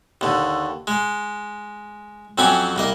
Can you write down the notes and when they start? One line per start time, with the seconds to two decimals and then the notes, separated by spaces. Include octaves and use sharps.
0.21 D#2 D3
0.87 G#3
2.38 F2 F#3 C4 C#4 G#5 D6
2.76 C2 A#3 D#5